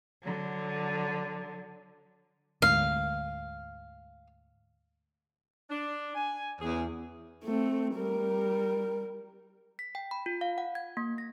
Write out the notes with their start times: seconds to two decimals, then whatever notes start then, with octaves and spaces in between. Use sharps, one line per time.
0.23 D3 F#3
2.62 D2 G#2 F5
5.70 D4
6.15 G#5
6.60 E2 C#4 G#4
7.44 A3 C4
7.95 G3 A#4
9.79 B6
9.95 G5
10.11 B5
10.26 F4
10.41 F5
10.58 F#5
10.75 G#6
10.97 A#3
11.18 A#6